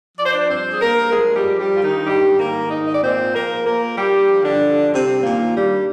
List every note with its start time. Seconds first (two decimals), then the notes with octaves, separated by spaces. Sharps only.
0.17 F3 D5
0.25 C5
0.32 D4 D5
0.48 G2 C4 C5
0.71 G#4
0.81 G2 A#3 A#4
1.11 F3 G#3 G#4
1.35 G3 G4
1.43 G2
1.59 G3 G4
1.74 G2 F4
1.83 D#3 D#4
2.07 G#2 G3 G4
2.38 D#3 A#3 A#4
2.69 G#2 D#4 D#5
2.85 D#5
2.94 D5
3.01 A#2 C4 C5
3.33 F3 A#3 A#4
3.64 A#2 A#3 A#4
3.96 G2 G3 G4
4.28 F3
4.43 D3 D4
4.60 G2
4.91 G2 C3 C4
5.23 A#2 D#3 A#3
5.54 G2 G3